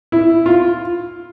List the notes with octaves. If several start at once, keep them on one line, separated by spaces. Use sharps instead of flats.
E4
F4